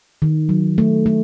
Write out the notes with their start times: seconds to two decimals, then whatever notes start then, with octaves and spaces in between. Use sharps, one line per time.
0.22 D#3
0.49 F#3
0.78 A3
1.06 A3